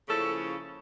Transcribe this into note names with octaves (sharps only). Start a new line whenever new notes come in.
C#3 F3 A#3 C#4 E4 A4